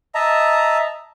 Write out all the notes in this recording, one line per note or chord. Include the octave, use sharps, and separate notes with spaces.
D#5 E5 A5 A#5